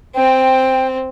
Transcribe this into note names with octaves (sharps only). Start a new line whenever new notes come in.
C4 G5